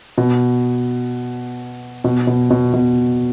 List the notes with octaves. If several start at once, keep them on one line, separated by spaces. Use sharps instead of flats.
B2
B2
B2
B2
B2